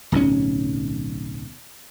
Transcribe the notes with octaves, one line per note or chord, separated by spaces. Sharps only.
D1 B1 A#2 C#4